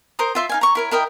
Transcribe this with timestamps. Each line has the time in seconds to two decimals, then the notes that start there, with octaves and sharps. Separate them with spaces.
0.19 A#4 C5 A#5 D#6
0.35 F4 E5 C6
0.49 D#4 F5 G#5
0.61 A#5 C#6
0.75 E4 A#4 C#5
0.91 E4 A#4 D#5 G5